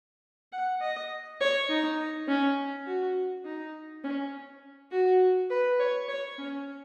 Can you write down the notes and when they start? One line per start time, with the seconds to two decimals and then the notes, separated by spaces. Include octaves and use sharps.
0.52 F#5
0.81 D#5
1.41 C#5
1.69 D#4
2.28 C#4
2.86 F#4
3.45 D#4
4.04 C#4
4.91 F#4
5.50 B4
5.80 C#5
6.08 C#5
6.38 C#4